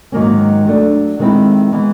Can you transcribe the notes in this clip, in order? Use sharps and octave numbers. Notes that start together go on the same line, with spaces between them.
G#2 D#3 F#3 A#3 C#4
F#3 A3 D4
D#3 G#3 C4 E4
E3 G#3 B3